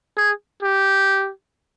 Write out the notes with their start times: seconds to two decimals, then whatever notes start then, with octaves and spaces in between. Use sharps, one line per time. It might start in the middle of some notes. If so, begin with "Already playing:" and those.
0.18 G#4
0.63 G4